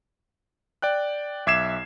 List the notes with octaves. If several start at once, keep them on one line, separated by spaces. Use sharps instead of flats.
D5 G5 F#6
B1 E5 D6 G#6 C7 E7